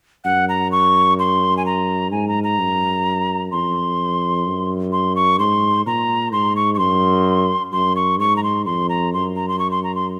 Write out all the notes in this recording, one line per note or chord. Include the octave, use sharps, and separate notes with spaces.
F#2 F#5
A#5
C#6
C6
G#5
A#5
G#2 G#5
A#5
A#5
F#2
F2 C6
F#2
C6
C#6
G#2 C6
A#2 A#5
G#2 C6
C#6
C#6
F#2 C6
F#2 C6
C#6
G#2 C#6
A#5
C6
F2 C6
A#5
F#2 C6
A#5
C6
C#6
C6
A#5
C6